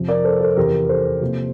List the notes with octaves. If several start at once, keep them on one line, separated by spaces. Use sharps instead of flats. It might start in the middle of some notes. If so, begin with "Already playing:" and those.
Already playing: F2 C3 F3
A#4 D5
A4 C5
A4 C5
E2 C3 F3 G4 A#4
A4 C5
C3 F3 A#3